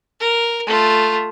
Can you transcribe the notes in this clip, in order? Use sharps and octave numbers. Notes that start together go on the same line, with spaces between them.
A#4
A3 F4